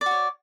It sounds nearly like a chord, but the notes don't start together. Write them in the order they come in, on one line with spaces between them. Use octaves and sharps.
D5 F#4 C#5